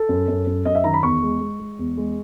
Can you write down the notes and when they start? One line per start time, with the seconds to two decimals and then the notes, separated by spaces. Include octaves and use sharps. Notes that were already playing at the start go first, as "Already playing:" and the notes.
Already playing: A4
0.09 F#2
0.28 F#2
0.47 F#2
0.65 F#2 D#5
0.75 E5
0.84 D#3 A#5
0.94 B5
1.03 E2 C#6
1.22 G#3
1.41 G#3
1.59 G#3
1.79 E2
1.97 G#3